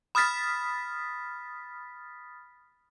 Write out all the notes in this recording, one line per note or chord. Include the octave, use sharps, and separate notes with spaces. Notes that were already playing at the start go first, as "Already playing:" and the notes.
B5 D#6 F6 A6 B6